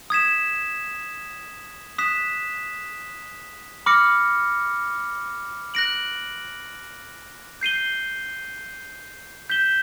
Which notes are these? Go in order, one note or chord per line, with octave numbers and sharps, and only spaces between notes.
D#6 G#6 B6 E7
D#6 F#6 B6 E7
B5 D6 F6 A#6 C#7
F#6 A#6 D7 F#7
G6 C7 D#7 G7
G6 B6 E7 G7